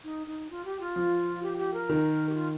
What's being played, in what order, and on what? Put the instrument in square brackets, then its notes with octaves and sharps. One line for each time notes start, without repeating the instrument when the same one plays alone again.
[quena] D#4
D#4
F4
G4
F4
[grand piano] F3
[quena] G4
G4
A#4
[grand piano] D#3
[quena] G4
F4